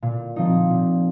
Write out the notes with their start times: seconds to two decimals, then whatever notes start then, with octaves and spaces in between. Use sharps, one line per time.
0.02 A#2
0.36 F3 C4 D#4
0.70 A#2